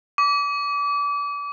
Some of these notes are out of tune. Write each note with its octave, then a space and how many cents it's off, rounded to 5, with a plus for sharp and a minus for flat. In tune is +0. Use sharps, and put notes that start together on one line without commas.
D6 -30